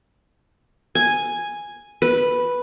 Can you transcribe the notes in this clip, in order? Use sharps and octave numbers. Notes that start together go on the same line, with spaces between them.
G#5
B4